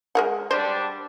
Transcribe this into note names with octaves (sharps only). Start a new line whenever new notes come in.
G#3 A#4 F#5
G3 D4 C5